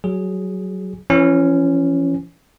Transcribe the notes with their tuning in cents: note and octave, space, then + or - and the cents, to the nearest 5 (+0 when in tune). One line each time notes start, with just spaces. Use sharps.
F#3 +15 G#4 +0
E3 +40 C#4 +0